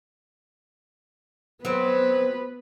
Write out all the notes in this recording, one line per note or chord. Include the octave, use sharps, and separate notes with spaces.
F#3 B3 C4 B4